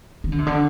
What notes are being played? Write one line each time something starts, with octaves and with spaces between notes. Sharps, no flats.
D#3
D3
C3
D3